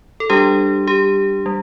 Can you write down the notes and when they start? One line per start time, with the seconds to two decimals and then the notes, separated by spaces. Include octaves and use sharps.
0.20 A4
0.30 G3 D4 G4
0.87 G4
1.46 G3